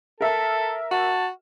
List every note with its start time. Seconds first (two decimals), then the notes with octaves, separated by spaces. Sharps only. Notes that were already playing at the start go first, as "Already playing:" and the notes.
0.21 A4 A#4 E5
0.91 F#4 A5